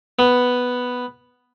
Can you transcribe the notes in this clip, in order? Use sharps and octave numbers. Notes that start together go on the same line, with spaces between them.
B3